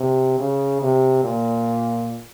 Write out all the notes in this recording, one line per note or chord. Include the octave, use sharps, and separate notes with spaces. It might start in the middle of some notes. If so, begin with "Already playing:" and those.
Already playing: C3
C#3
C3
A#2